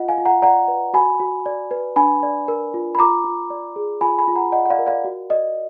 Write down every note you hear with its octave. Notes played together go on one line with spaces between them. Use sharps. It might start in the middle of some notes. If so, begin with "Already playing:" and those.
Already playing: F4 D#5 F#5
F5 G#5
F4
F#5 A#5
D5 F#5 A#5
B4
F#4 G#5 B5
F#4
D5
B4
D4 G#5 B5
D5
A#4
F4
B5
F4 A#5 D6
F4
D5
G#4
F4 G#5 B5
G#5 B5
F4
F#5 A#5
D5 D#5 F#5
F#5
D5 F5
A#4
D5 F5
F#4
D5 D#5